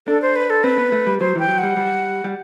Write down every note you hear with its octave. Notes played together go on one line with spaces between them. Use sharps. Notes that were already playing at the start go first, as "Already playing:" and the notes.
D4 A4
C5
B4
A4
C4 B4
B3
A3
G3
F#3 C5
E3 G5
F#3
G3 F#5
G3
G3